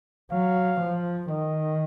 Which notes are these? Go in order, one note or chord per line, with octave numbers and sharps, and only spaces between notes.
F#3 F5
F3
D#3 D#5